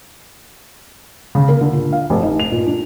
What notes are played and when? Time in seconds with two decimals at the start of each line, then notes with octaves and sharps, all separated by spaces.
1.35 C#3
1.49 A#3
1.61 D3
1.73 A#2
1.93 F5
2.10 F1
2.23 D#4
2.40 F7
2.52 A#2
2.67 D4